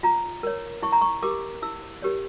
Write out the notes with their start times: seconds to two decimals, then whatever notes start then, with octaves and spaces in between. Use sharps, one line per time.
0.03 F4 A#5
0.43 A#4 C#5
0.82 E4 C#6
0.92 A#5
1.01 C#6
1.23 G4 A#4 D6
1.62 E4 E6
2.02 G4 A#4 C#5